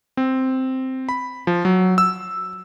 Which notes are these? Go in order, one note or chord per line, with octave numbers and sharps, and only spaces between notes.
C4
B5
F3
F#3
E6